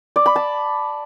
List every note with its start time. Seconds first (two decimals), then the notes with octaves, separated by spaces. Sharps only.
0.16 D5
0.26 B5
0.36 A5